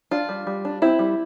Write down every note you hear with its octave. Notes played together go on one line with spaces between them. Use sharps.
D4 F4
G3
G3
D4
C4 E4
G3